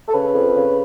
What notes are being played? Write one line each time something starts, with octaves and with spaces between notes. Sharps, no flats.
A4
C#3 B4
F2
C#3